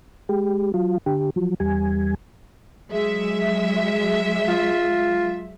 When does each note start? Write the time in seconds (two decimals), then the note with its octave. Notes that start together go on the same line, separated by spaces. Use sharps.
0.29 G#3 G4
0.74 F#3 F4
1.06 D3 G4
1.36 F3 F#3
1.60 E2 G3 G#5
2.90 F#3 G#3 E5
4.48 F4